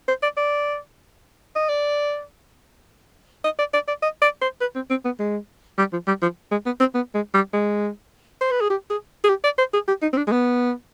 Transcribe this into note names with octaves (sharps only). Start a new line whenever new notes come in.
C5
D5
D5
D#5
D5
D#5
D5
D5
D5
D#5
D5
C5
B4
C4
C4
B3
G#3
G3
F3
G3
F3
G#3
B3
C4
B3
G#3
G3
G#3
C5
B4
G#4
G4
G#4
G#4
G4
D5
C5
G#4
G4
D#4
C4
D4
G#3
B3